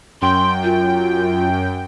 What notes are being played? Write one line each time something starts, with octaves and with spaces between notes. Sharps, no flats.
F#2 G5 C6
F4